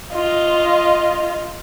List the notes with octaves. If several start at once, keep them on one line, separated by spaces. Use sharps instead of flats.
F4 D#5